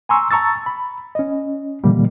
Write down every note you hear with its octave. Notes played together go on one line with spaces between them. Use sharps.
G#5 A#5 C6 C#6 E6
A5 A#5 C#6 E6 A6
B5
C#4 D#5
A#2 D3 E3 G3 A#3